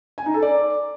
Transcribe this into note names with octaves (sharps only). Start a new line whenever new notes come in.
G#5
D#4
A4
D5